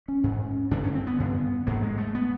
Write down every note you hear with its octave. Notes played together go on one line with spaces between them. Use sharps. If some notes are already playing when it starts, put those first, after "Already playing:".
C#4
G#2
G2 D3 D4
C#4
C4
B3
G2 D3
G#2 A#3
G#3
A3
B3